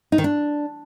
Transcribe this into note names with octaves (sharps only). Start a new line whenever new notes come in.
D#4
D#3
D4